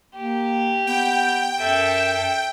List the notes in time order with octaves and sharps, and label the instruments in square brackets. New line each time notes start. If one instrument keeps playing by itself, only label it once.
[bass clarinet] A#3 [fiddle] G4
[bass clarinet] B3 [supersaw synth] G5
[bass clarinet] F#2 [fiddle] A4 E5